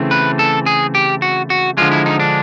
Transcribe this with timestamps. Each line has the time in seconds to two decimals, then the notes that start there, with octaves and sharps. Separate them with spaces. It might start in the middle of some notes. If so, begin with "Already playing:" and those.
Already playing: C#3 E3 A3 C4
0.11 B4
0.39 A4
0.66 G#4
0.95 G4
1.22 F#4
1.50 F#4
1.77 D3 F3 G#3 F4
1.92 E4
2.06 D#4
2.20 D4